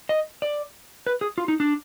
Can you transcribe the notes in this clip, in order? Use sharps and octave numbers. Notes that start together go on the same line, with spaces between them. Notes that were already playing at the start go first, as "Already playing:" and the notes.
D#5
D5
B4
G#4
F4
D#4
D4